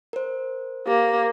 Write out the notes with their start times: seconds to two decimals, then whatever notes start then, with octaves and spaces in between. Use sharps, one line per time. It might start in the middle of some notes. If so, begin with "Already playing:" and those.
0.13 A#4 C5
0.87 A#3 G4